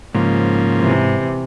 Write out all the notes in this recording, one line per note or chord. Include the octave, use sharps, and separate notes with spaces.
G#2 C#3 F3 A#3
C3 E3